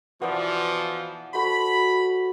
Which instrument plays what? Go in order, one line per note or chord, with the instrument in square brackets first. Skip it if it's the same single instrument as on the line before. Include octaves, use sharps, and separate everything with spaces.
[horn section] B2 E3 F3 [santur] B3 C5 D5
[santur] F#4 A4 C5 [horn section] B5